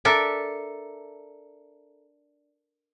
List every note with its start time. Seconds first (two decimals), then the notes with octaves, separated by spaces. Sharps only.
0.05 D4 A4 A#4 E5